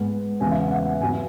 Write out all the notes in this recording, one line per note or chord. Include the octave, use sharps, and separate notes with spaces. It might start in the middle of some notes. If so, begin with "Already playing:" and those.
Already playing: G#2 G#3 B3 F#5
E2 C#3 E3 G#3 B3 G#5
E5
F#5
F#5
F#5
G#2 F#3 B3 G#5